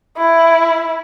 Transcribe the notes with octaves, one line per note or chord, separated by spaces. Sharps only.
E4